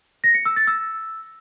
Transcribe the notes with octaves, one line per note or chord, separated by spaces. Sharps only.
A#6
C#7
E6
A6
E6